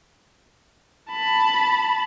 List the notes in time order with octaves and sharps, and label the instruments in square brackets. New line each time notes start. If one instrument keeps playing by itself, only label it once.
[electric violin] A5 B5